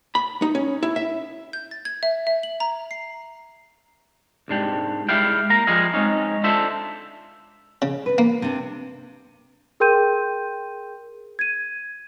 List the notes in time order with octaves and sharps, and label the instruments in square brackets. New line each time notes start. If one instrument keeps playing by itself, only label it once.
[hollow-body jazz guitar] B5
D#4
C#4
E4
E5
[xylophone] G6
A6
G#6
E5
E5
F#7
A#5
C7
[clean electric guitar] C2 G#2 D4 G4
G3 G#3 E4 F5 G5
A#3 A#5
F3 G3 G#3 G#4 D#5 F5
G#3 C4 C#4 D#4
D4 F4 A4 C5 E5
[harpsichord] C#3
[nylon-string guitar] B4
[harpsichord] A#3
[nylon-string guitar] C3 D4
[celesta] G#4 A#4 G5 C6 G6 D#7
G#6 D#7